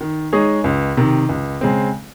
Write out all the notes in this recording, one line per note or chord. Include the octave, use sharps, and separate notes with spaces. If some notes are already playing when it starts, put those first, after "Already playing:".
D#3
G#3 D#4 G#4 C#5
C#2
C3 D#3
C#2
C#3 G#3 C4